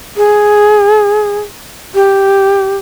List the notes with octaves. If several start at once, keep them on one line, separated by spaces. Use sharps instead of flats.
G#4
G4